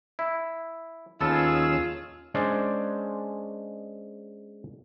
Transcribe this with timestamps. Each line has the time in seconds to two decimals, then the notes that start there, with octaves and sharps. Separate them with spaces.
0.19 E4
1.21 D#2 B3 C#4 F4 G#4 A4 E6
2.34 G#3 C#4 D4 C5 D5